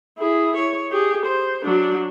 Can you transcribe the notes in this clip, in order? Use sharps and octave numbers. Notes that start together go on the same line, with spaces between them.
E4 G#4
C#5
G4 G#4
C5
F#3 D4